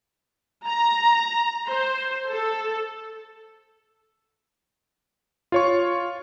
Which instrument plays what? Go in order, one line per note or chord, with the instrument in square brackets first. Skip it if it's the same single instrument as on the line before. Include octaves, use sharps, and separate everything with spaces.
[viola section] A#5
C5
A4
[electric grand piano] F4 C#5 C#6